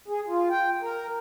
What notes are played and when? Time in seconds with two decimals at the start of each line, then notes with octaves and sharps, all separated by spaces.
0.08 G#4
0.28 F4
0.50 G5
0.82 A#4